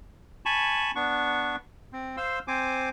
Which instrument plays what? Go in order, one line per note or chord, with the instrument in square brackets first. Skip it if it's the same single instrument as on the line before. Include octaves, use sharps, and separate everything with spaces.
[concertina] G#5 A5 B5 C#6
B3 D4 C#6
C4
C5 F5 C6 E6
C4 C5 G#5 D6